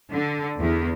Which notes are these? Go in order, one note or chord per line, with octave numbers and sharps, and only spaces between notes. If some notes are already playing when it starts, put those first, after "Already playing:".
D3
E2